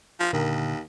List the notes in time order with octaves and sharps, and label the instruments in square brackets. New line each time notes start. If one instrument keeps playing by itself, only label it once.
[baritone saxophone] F3
[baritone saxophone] D#2 [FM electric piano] A#2 D3 A#4